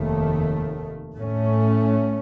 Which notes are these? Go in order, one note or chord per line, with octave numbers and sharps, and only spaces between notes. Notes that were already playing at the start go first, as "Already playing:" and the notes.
Already playing: F1 D#2 D#3 A3
A2 A3 C#4